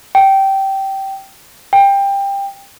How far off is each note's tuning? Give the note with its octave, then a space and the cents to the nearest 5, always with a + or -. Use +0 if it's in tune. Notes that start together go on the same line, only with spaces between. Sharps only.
G5 -15
G5 +20